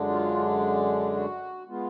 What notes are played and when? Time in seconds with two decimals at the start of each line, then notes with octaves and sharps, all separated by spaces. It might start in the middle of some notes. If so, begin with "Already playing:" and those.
Already playing: F#2 D3 G#3 D4
0.09 F4
1.15 F#4
1.69 G#3 B3 F4